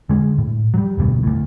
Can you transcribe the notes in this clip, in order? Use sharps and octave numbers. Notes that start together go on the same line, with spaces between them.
D3 G#3
A2
F#3 G3
F1 D2 G2 B2
D2 A2